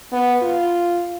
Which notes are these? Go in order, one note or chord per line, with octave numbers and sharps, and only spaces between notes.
B3
F4